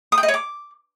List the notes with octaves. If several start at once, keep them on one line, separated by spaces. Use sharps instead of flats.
D#6
G5
D#5
C#5
D6